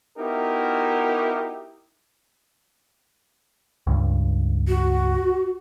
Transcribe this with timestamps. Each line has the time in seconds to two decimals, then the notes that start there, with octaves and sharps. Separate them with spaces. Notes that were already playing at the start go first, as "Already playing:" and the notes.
0.17 B3 D#4 E4 F#4 G4 A#4
3.87 C#2 G2
4.68 F#4